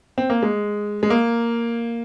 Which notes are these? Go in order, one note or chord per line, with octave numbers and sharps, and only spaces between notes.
C4
A#3
G#3
G#3
A#3